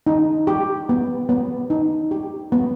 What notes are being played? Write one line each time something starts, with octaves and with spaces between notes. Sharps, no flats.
D#4
G4
B3
B3
D#4
G4
B3